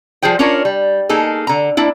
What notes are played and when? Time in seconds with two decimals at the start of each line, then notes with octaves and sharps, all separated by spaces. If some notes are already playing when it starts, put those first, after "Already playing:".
0.22 F3 G3 G#4 C5 G5
0.39 C#4 D4 F4 A#4 C#5
0.65 G3
1.09 A#3 D#4 G#4 A4
1.47 D3 A#5
1.77 A#3 D4 E4